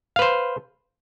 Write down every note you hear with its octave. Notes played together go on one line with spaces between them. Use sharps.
B4 C5 F5